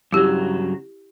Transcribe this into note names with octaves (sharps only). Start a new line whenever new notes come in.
G2 C#3 F#3 E4 G4